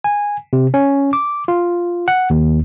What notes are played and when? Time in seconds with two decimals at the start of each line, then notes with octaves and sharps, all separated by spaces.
0.04 G#5
0.53 C3
0.74 C#4
1.13 D6
1.48 F4
2.08 F#5
2.30 D#2